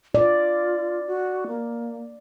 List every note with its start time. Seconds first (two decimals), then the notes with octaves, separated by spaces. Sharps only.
0.15 F4 D5
1.07 F#4
1.47 A#3